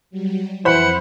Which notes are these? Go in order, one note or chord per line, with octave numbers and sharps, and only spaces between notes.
F#3 G3
F2 E3 E4 C5 F#5 B5